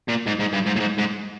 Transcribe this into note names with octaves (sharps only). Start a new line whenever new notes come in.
A#2
G#2
G#2
G2
G#2
A2
G#2
G#2